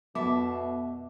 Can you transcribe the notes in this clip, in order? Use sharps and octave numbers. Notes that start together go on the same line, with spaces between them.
F2 B2 A3 B3 E5 A5 D6